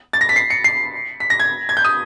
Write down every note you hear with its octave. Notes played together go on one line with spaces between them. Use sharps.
A6
A#6
B6
C7
C#7
C7
B6
A#6
G#6
G#6
G6
D#6